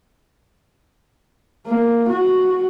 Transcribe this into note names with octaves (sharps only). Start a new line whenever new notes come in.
A#3
F#4